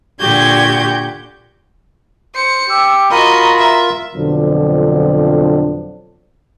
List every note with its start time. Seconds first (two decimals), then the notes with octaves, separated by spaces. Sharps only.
0.19 A#2 D3 F#4 G4 G6 G#6
2.35 C5 C#7
2.69 G4 E6
3.11 F4 F#4 A#4 D#5 A#5 B5
3.58 E5
4.15 F2 B2 D3 F3 F#3 D4